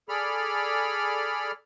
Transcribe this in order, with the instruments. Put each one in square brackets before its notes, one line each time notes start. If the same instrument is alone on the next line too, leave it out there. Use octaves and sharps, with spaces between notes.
[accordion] G#4 A4 D5 B5 F6